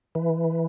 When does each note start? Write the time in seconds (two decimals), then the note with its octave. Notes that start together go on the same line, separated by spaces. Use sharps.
0.15 E3